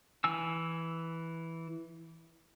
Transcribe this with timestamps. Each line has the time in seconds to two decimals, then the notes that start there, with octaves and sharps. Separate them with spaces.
0.24 E3 G#5 E6